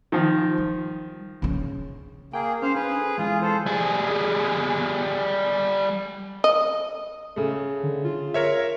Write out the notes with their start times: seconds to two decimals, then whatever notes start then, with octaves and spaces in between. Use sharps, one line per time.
0.12 D#3 F3
0.58 G3
1.42 C#3 C#4
2.33 A#3 G#4 G5
2.62 C#4 C5 F5
2.75 D4 G#4 B4
2.99 A4
3.18 E3 G#3 F4 G#4
3.42 A4 C5
3.66 G3 G#4
6.44 D#5
7.36 C#3 A3
7.83 D3
8.05 F4
8.34 A#4 C#5 E5